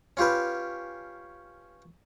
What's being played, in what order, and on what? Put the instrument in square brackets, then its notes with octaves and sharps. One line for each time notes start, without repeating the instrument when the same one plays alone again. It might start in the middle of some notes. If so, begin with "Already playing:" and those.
[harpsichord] C#4 F4 G4 B4